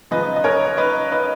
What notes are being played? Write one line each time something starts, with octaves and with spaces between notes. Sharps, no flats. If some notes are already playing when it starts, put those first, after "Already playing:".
F#2 C#3 F3 B4 D#5
D#5
A#4 C#5
B4 D#5
B4 D#5